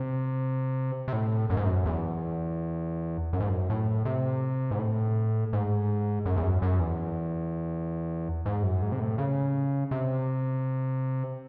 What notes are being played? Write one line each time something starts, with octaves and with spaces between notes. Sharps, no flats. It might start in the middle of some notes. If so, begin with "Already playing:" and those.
Already playing: C3
C3
A2
F#2
G#2
F#2
E2
F#2
G#2
F#2
A2
C3
G#2
A2
G#2
F#2
E2
F#2
F#2
E2
G#2
F#2
G#2
C3
A2
C#3
C3